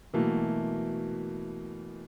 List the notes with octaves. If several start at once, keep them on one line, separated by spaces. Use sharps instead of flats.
B2 E3 F#3 A3 A#3